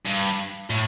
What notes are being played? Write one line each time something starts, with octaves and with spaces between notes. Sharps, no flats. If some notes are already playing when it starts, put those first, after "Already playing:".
G2
A2